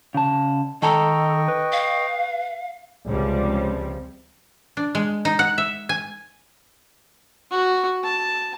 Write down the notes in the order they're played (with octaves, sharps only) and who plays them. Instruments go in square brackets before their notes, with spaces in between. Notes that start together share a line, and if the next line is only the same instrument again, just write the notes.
[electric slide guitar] C#3 A5
[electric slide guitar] D#3 A5 A#5 [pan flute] A4 [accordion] D#5 G5 C#6
[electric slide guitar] B4
[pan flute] F5
[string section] C#2 C3 F3 G3
[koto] D4
G#3
D#4
F#5
E5
G#5
[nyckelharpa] F#4
A5